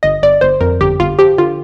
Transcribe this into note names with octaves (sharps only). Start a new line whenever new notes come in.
G1 D#5
G1 D5
G1 C5
F2 A#4
G1 G4
G1 F4
F3 G4
D3 F4